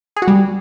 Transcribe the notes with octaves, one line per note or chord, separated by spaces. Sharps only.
G#4
F#4
G3